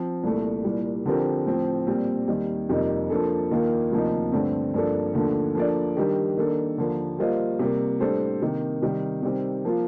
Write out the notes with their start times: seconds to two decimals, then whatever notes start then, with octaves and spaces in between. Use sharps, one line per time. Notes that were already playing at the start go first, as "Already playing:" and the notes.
Already playing: F3 C4
0.23 C2 A#2 A3
0.64 C2 A#2 G3
1.06 D3 F3 C4 G4 A#4
1.46 A2 F3 C4
1.87 A#2 G3 C4
2.28 D#2 D#3 G3
2.69 F2 C3 G3 A#3 D#4
3.10 F3 A#3 D4 A4
3.51 D#2 D#3 A#3 F4
3.92 D2 C3 F3 A#3 D#4
4.32 G2 D3 A3 C4
4.74 G2 F3 A#3 D4 A4
5.14 D#2 D3 F3 A3 D4
5.55 F3 A#3 D4 A4 D5
5.97 D#3 G3 D4 G4 A#4
6.37 D#3 A#3 D4 A4
6.78 D#2 D3 F3 A#3
7.19 G3 A#3 F4 C5 D#5
7.59 C3 G3 A#3
8.00 A2 G3 D4 A4 C5
8.42 C3 D#3 A#3
8.82 C3 D#3 G3
9.23 C3 D#3 G3 C4
9.65 F3 A#3 F4